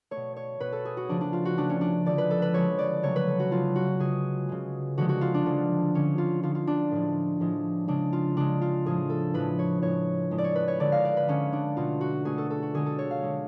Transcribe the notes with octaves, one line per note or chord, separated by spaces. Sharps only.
A3 C#5
B2
C#5
B2 A3 B4
A4
G#4
F#4
C#3 F3 A3 D4
D4
F4
F#4
C#3 F3 A3 D4
C#4
D4
D3 F3 G#3 D5
B4
A4
B4
D3 F3 G#3 C#5
D5
C#3 F#3 A3 C#5
B4
A4
F#4
C#3 F#3 A3 F4
F#4
C#3 G#3 G#4
C#3 G#3
D3 F3 G#3 F#4
F#4
F4
D4
D3 F3 G#3
D3 G#3 C#4
F4
D3 G#3 F4
F4
D4
A2 F3 G#3
A2 F3 G#3
C#3 G#3 D4
F4
C#3 G#3 D4
F4
A2 F3 G#3 G#4
A4
A2 F3 G#3 B4
C#5
A2 G#3 C#5
A2 G#3
D5
C#5
B4
C#5
D3 G#3 D5
F5
D5
B4
D3 G#3 C#4
D4
B2 A3 F4
F#4
B2 A3 G#4
A4
A4
F#4
D3 G#3 G#4
A4
C#5
F5
D3 G#3